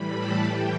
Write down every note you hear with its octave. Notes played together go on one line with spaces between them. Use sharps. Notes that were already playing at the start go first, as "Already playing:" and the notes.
Already playing: A2 E3 G3 B5
A5
A2 E3 G3 G5